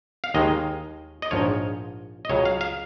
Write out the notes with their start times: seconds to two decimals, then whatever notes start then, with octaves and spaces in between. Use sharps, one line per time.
0.24 F5
0.34 D#2 D#3 G#3 D#5
1.22 D#5
1.31 A#1 G#2 F3 C#5
2.25 D#5
2.29 C#2 C#3 F#3 C#5
2.45 F5
2.61 F5